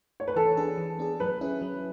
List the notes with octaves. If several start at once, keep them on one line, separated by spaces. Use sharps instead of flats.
C#5
B4
E3 A4
B3 D4 G#4
E3
B3 D4 G#4
F#3 B4
C#4 E4 G#4
F#3